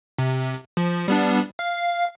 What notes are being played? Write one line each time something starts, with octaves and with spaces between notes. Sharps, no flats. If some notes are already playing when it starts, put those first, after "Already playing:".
C3
F3
G3 B3 D4
F5